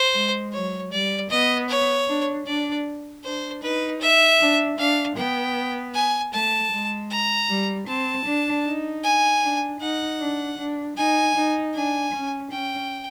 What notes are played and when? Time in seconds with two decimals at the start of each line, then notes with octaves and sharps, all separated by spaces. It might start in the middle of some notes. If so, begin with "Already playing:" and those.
Already playing: C5
0.14 G#3
0.53 F#3 C#5
0.92 G3 D5
1.30 B3 D#5
1.69 C#5
2.08 D4
2.46 D4 D5
3.24 D4 C5
3.63 D#4 B4
4.01 E5
4.40 D4
4.78 D4 F5
5.17 B3 G5
5.94 G#5
6.33 A3 A5
6.72 G#3
7.10 A#5
7.50 G3
7.88 C4 A5
8.26 D4
8.65 D#4
9.04 G#5
9.42 D4
9.81 D#4 F#5
10.20 D4
10.58 D4
10.97 D#4 G#5
11.35 D#4
11.74 D4 G#5
12.13 C#4
12.52 C#4 G5